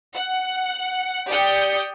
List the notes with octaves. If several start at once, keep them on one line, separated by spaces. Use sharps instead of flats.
F#5
G4 D5 G5 D#6 G6 C#7